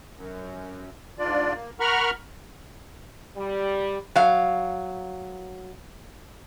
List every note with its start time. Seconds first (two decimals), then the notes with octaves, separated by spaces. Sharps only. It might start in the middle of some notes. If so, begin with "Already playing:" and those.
0.16 F#2
1.19 G#2 D4 F4 D5
1.54 A#3
1.80 A#4 F#5 A#5 B5 C#6 F6
3.36 G3
4.16 F#3 F5